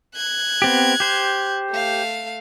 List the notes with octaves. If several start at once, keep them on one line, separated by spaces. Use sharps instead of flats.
F#6 G#6
B3 C4 G4
G4 C5
A3 F5